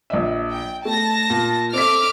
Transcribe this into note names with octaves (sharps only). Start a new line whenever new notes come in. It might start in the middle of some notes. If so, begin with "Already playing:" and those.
A#1 D#5 E5
G5
A3 A5 A#6
A#2
C4 A4 E5 D6 F6 B6